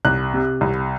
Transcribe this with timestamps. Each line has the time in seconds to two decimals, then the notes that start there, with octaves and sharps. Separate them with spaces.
0.05 C2 F#6
0.34 C3
0.61 C2